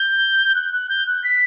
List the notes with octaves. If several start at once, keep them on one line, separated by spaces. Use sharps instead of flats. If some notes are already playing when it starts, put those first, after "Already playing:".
Already playing: G6
F#6
F#6
G6
F#6
B6